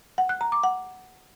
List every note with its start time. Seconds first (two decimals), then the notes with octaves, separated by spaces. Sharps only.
0.18 F#5
0.29 F#6
0.41 A#5
0.52 D6
0.63 F#5